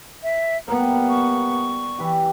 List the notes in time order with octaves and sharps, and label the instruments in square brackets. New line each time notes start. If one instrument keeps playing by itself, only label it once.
[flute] E5
[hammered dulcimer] G3 A#4 [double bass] A#3 B3 [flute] A#5
[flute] C#6
[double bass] E3 [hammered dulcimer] G4 B4